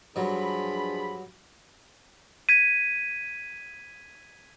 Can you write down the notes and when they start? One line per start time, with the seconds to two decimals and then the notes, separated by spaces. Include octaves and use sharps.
0.16 G2 F3 F#3 D4 G#4 B5
2.49 G#6 B6 D#7